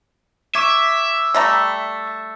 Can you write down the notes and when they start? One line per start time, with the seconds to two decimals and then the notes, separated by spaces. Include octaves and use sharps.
0.55 E5 C#6 D6 G#6
1.34 G3 A3 A#5